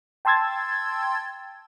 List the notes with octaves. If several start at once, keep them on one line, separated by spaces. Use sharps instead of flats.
G5 A5 C6 E6 G#6 A6